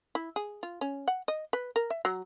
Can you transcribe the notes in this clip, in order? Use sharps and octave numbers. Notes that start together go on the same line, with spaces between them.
E4
G#4
F4
C#4
F#5
D#5
B4
A#4
E5
F#3